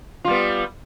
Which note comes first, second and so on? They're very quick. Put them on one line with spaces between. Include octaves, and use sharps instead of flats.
F4 G3 B3